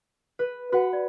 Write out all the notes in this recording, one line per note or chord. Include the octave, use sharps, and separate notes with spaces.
B4
F#4 B4 F#5
D5